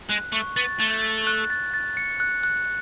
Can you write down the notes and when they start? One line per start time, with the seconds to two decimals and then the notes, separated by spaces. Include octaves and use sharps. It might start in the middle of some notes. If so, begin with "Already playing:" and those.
0.09 G#3 F#6
0.32 A3 C#6
0.56 B3 A6
0.80 A3 A6
1.03 A6
1.27 F#6
1.50 A6
1.74 A6
1.97 C#7
2.20 F#6
2.44 F#6